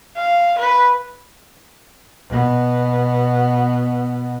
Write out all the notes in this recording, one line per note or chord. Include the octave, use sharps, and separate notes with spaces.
F5
B4
B2 B3